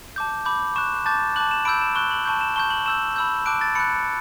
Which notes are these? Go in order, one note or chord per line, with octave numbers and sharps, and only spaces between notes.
A5 D6 G6
B5 D6 G6
C#6 F#6 E7
A5 D6 G6 A6
A5 D6 F#6 F#7
E7
B5 E6 G6 D7
E7
C#6 F#6 G7
F#7
A5 C#6 G6
E7
A5 C#6 G6 G7
F#7
C#6 E6 G6 E7
B5 E6 G6
A5 D6 F#6 D7
A6
B5 F#6 C#7